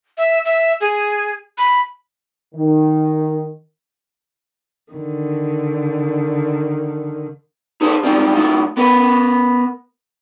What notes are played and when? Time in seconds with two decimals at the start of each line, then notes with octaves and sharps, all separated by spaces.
0.17 E5
0.45 E5
0.81 G#4
1.58 B5
2.54 D#3
4.93 D3 D#3
7.81 D#4 G#4 A4 B4 C5
8.03 G3 G#3 C4 D#4 F4
8.35 A2 F#3 D#4 F4
8.77 B3 A#4 B4